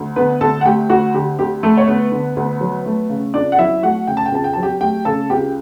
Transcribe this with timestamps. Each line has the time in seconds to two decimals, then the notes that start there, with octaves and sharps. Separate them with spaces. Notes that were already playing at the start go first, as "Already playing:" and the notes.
Already playing: D2
0.16 D3 B3 B4
0.41 D2 A4 A5
0.61 F#5
0.65 A3 G4 G5
0.90 D2 F#4 F#5
1.14 D3 G4
1.39 D2 G4
1.63 A3 A4
1.77 C#5
1.88 D2 B3 B4
2.12 D3
2.37 D2
2.61 F#3
2.86 A3
3.10 C#3
3.34 C#2 D4 D5
3.52 F#5
3.58 F#3 E4 E5
3.83 A3 F#4 F#5
4.07 C#3 G5
4.17 A5
4.26 G5
4.32 C#2 A5
4.44 G5
4.53 F#3 A5
4.63 G4 G5
4.81 A3 G4 G5
5.05 C#3 A4 A5
5.30 C#2 G4 G5